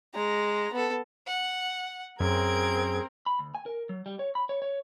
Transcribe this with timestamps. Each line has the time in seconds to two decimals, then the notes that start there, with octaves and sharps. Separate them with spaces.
0.15 G#3 A#5
0.73 B3 A4
1.26 F#5
2.20 F#2 C4 G#4 A#4 G#6 D7
3.26 B5
3.39 D2
3.55 G#5
3.66 A#4
3.89 F#3
4.06 G3
4.19 C#5
4.35 B5
4.49 C#5
4.62 C#5